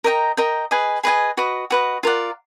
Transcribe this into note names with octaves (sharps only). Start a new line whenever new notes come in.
A#4 D#5 G5 A#5
A#4 D#5 G5 A#5
G#4 B4 D#5 G#5
G#4 B4 D#5 G#5
F#4 B4 D#5
F#4 B4 D#5
F4 A#4 D5 F#5